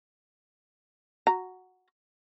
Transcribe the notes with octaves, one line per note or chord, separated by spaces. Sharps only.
F#4 A#5